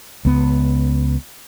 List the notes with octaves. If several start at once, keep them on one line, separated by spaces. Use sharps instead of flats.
C#2 B3